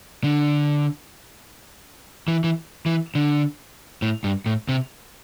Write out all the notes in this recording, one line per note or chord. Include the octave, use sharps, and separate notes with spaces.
D3
E3
E3
E3
D3
A2
G2
A2
C3